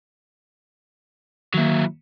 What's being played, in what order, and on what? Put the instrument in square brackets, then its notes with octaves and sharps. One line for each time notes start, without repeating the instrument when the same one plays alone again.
[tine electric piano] D#3 A#3 [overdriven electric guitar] F#3 E4